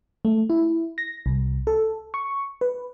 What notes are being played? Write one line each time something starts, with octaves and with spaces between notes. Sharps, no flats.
A3
E4
A#6
C2
A4
C#6
B4